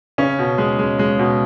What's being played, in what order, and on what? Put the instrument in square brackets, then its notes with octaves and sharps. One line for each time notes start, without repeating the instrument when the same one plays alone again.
[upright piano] C#3 [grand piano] C#4
[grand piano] B2
G#3
G#3
G#3
B2